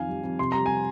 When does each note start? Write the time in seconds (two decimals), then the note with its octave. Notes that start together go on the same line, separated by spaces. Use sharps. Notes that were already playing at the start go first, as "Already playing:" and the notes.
Already playing: F2 D#3 F5 G#5
0.09 G3
0.24 F2
0.39 C3 C6
0.52 G3 A#5
0.66 G3 G#5